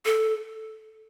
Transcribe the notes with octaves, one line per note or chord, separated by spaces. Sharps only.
A4